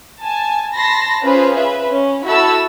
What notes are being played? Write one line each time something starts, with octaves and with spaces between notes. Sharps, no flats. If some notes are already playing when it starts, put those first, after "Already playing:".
G#5 A5
A5 B5 C6 A#6
C#4 F4 G#4 B4 C5
B4 E5
C#4
E4 F#4 A4 A5 B5 E6